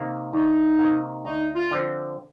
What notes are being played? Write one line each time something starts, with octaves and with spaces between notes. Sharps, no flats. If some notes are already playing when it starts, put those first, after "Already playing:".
Already playing: C3 D#3 A#3
D2 D#4
C3 D#3 A#3
D2 D#4
F4
D3 F3 C4